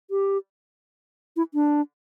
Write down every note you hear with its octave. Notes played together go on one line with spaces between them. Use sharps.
G4
E4
D4